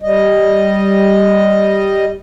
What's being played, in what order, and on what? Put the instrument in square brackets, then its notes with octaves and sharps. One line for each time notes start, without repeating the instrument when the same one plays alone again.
[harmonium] G3 D#5